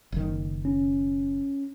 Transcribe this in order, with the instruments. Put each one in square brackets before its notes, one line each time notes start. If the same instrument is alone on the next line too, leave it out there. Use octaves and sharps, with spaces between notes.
[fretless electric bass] F#1 D#3
[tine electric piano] C#4